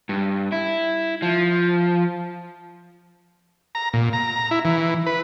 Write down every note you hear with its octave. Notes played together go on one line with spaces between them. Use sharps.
G2
E4
F3
A#5
A#2
A#5
E4
E3
B4